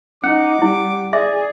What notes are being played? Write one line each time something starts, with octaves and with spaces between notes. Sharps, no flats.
C#4 D#4 F#5 D6
G3 E4
G#4 D5 E5